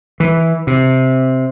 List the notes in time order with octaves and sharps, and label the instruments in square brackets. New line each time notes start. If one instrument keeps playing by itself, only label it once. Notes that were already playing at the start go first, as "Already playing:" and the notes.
[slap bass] E3
C3